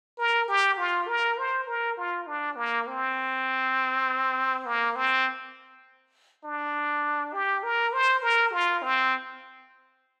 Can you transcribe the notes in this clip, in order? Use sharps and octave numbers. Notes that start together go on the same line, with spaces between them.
A#4
G4
F4
A#4
C5
A#4
F4
D4
A#3
C4
A#3
C4
D4
G4
A#4
C5
A#4
F4
C4